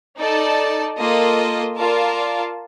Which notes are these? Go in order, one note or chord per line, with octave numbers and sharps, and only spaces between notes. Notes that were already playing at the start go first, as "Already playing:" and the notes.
D#4 A4 D5 A5
A#3 F4 A4 D#5
F4 A#4 D5 A5